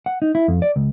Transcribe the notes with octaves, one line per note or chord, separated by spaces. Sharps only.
F#5
D#4
E4
F2
D5
C#2